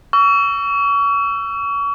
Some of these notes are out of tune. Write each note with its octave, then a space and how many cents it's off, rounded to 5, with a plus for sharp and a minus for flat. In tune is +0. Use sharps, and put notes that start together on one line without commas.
C#6 +35 E6 +30